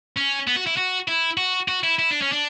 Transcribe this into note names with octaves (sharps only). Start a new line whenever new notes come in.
C#4
B3
F#4
E4
F#4
E4
F#4
F#4
E4
E4
D4
C#4
D4